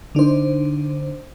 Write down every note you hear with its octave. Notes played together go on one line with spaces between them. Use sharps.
D3 D4 D#4 C5